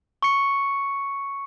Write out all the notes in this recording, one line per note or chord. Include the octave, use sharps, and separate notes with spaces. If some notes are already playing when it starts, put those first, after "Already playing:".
C#6 C#7